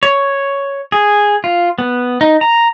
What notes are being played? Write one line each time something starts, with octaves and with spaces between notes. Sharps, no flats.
C#5
G#4
F4
B3
D#4
A#5